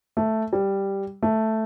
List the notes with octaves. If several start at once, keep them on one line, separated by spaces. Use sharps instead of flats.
A3
G3
A3